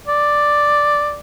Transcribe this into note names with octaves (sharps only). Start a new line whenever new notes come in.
D5